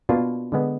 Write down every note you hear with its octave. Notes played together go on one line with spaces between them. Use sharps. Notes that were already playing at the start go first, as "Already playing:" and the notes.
B2 A#3 D4 F4
D3 G#3 B3